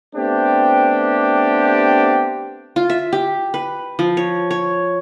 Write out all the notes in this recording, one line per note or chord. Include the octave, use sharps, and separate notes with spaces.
A3 B3 C4 D4 G4
F4
E5
G4
B4
F3
C#5
C#5